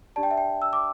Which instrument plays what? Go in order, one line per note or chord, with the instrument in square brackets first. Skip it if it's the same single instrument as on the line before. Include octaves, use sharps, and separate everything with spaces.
[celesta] D4 G4 D5 A5
G5
E5
G5
E6
D6